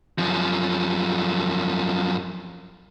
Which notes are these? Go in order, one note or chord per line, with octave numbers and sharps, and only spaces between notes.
F#2 F3